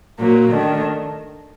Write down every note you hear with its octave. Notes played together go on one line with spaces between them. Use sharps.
A#2 F#3 A#3
D#3 A3 D4